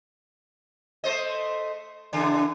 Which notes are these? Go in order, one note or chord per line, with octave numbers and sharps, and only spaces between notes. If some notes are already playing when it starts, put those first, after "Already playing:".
A3 C5 D#5
E2 C#3 D4